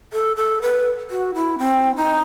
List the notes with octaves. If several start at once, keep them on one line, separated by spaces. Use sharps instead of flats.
A4
A4
B4
F#4
E4
C4
D#4